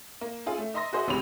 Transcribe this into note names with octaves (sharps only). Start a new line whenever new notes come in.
A#3
C#4 F4 G#4 A4
A3
D#5 E5 A#5 C6 D#6 A#6
F#4 G#4 C5 D#5 E5
G#1 C#2 C3 C#4 B5 F7